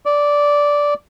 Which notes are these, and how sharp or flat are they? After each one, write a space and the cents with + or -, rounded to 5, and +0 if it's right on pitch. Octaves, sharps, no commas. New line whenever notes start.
D5 -10